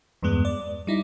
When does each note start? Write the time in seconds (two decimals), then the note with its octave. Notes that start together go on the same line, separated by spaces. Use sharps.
0.23 E2 G2 G#3 B3
0.45 D5
0.87 G3 D#4 E4